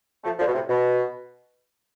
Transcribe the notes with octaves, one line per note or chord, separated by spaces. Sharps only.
F3 A3
D3 F3
B2
A2 C3
B2